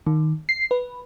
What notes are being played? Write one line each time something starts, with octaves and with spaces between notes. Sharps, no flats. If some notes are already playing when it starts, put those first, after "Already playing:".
D#3
C7
B4